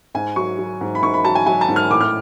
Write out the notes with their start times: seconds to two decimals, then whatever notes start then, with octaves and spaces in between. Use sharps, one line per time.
0.14 G#2 G#5
0.36 F#3 C#6
0.59 F#3
0.81 G#2
0.95 B5
1.02 G#2 C#6
1.14 B5
1.24 F#3 A5
1.35 G#5
1.46 F#3 G#5
1.61 A5
1.68 G#2
1.76 F6
1.91 A2 D6
2.01 F6